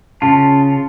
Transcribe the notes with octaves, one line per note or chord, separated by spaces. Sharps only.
C#3 C#4 F4 A5